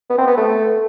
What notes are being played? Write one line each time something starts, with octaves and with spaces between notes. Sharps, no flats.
B3
C4
B3
A3